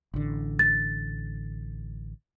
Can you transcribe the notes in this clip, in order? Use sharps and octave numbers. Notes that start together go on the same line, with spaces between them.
A1 D3
A6